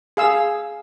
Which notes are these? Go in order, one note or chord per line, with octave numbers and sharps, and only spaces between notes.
G#4 F5 E6